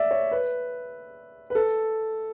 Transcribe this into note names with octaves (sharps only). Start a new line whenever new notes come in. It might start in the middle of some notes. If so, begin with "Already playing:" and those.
Already playing: D5 E5
C#5
B4
B4
A4